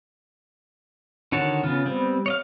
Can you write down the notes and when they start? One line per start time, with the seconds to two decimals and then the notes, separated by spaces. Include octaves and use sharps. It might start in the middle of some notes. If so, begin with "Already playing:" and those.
1.32 D3 D#3 F#4 C#5 A5
1.63 C#3 B3 F4
1.86 G3 B3 C4
2.26 C#5 D#5 F5